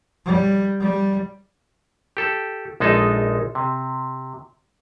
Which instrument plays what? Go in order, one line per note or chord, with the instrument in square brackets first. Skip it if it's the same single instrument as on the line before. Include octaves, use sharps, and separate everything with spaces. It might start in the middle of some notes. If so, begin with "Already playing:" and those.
[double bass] G3
G3
[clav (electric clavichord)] G4 A4
A#1 G#3 D#4 A4
C3